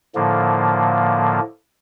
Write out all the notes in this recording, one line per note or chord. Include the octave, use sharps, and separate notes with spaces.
A2 D3 F3 A#3